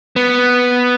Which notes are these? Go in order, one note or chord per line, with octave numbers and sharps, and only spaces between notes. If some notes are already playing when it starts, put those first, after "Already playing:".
B3